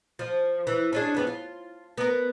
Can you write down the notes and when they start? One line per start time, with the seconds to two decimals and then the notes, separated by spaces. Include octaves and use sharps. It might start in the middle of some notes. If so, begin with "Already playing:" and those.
0.19 F3
0.67 E3
0.93 C#4 D4 G#4
1.14 F2 B3 C4
1.27 F4
1.98 B3 A#4